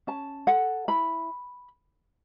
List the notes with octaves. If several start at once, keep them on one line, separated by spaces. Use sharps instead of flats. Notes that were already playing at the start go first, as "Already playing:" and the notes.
C#4 A5
A4 F#5
E4 B5